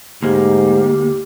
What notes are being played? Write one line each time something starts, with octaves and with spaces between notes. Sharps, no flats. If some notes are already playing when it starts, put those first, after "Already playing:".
D2 G#2 A#3 G4